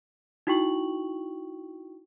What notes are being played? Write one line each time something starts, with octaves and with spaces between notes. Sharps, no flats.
D#4 E4 F#4 G5 C#6 F#7